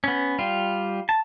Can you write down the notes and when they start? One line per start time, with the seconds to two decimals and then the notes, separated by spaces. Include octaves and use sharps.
0.04 B3 C#4
0.39 G3 F4
1.09 A5